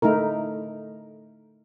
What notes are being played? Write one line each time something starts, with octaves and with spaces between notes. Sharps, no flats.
A3 D#4 E4 A#4